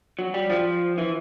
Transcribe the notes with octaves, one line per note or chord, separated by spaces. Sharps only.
F#3
G3
F3
E3